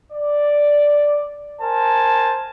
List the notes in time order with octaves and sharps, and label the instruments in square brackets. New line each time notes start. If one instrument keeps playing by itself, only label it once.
[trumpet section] D5
A#4 C5 G#5 A5